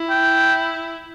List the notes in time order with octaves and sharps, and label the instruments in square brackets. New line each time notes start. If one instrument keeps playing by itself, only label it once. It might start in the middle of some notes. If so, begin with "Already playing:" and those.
Already playing: [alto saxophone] E4
[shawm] G5